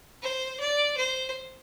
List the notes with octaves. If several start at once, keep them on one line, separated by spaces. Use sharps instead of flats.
C5
D5
C5